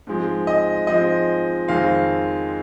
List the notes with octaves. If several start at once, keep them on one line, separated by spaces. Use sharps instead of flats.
G#2 F3 G#3 C4
D#5
G#2 F3 G#3 C4 D#5
F2 D#3 G#3 C4 F5